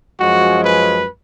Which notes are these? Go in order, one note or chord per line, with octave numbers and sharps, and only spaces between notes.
F#2 F3 G#3 C#4 F#4
B4